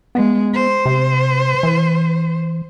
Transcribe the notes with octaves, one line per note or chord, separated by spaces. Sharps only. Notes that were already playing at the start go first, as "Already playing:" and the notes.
G#3 B3
C5
C3
E3